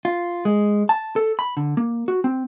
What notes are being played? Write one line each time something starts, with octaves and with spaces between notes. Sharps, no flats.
F4
G#3
A5
A4
B5
D3
A#3
F#4
C4